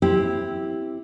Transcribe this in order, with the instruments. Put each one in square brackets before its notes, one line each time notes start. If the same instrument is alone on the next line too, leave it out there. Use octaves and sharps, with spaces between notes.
[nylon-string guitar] C4 E4 G4